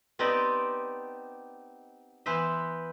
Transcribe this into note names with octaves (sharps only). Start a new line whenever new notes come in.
B3 C4 D#4 G4 D5 D#5
E3 B3 B4 C5 E5